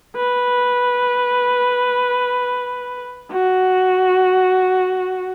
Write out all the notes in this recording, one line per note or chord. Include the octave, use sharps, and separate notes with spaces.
B4
F#4